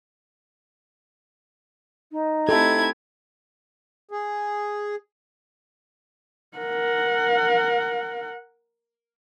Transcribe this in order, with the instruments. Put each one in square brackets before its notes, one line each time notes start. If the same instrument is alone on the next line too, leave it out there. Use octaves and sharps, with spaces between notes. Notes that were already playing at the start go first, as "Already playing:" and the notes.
[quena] D#4
[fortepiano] A3 C4 G4 [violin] E4 G#6 [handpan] A4
[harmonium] G#4
[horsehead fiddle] A#4 F#5